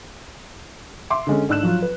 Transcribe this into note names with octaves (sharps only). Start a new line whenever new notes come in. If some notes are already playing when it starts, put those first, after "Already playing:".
E5 C6 D6
D3 G#3 C#4
G#2 D4 E6 F#6 E7
F3 F#3 F4
B4